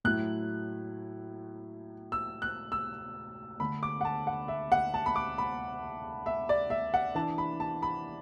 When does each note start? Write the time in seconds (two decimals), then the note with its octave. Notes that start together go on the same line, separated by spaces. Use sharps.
0.04 A2 F#3 A3 E4 F#6
2.12 E6
2.42 F#6
2.72 E6
3.60 D3 A3 D4 B5
3.83 D6
4.01 F#5
4.05 A5
4.27 F#5
4.48 E5
4.72 F#5
4.94 A5
5.06 B5
5.16 D6
5.38 B5
6.26 E5
6.49 D5
6.70 E5
6.94 F#5
7.15 E3 D4 A5
7.38 B5
7.60 A5
7.82 B5